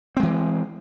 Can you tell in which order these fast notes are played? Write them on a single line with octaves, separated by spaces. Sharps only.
C4 G#3 E3